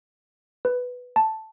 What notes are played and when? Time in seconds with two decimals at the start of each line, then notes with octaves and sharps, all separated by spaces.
0.65 B4
1.16 A5